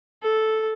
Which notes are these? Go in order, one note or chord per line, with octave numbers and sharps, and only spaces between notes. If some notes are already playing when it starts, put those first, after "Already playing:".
A4